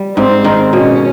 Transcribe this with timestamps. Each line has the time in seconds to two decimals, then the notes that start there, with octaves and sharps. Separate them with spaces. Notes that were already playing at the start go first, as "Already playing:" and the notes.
Already playing: G3
0.16 G#2 C4
0.44 D#3
0.73 B2 C#4